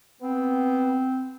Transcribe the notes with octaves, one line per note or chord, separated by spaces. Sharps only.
B3 C4